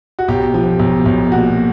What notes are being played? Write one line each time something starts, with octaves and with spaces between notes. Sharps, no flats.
F#4
B1 G4
F3
B1
B1
A#2 F#4